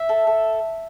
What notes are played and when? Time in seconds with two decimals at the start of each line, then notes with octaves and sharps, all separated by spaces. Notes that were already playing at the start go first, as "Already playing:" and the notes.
Already playing: E5
0.09 A4
0.27 A4